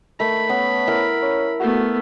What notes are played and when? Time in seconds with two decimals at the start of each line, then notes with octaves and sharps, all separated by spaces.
0.20 D#3 A3 B5
0.49 B3 C#4
0.87 E4 A#4
1.22 C#4
1.60 A3 B3 F#4